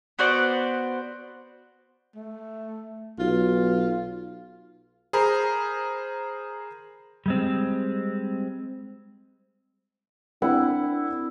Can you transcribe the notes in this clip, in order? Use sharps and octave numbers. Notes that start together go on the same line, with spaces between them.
B3 F#4 C5 D5
A3
B1 F4
G#4 A#4 C5 A#5 B5
G3 G#3 C4
C4 D4 E4 A#4 F#5